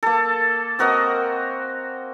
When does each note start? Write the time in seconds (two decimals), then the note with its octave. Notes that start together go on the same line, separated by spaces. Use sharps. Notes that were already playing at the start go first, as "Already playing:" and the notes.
0.03 A#3 A4
0.79 C4 F#4 A#4 D#5